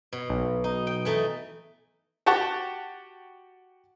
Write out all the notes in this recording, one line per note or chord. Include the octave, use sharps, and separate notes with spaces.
B2
B1
D#4
G5
E3 A3 D#4
F#4 G4 F#5 A5 C#6